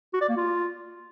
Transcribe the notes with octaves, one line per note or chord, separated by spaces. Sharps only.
F#4
D5
A#3
F4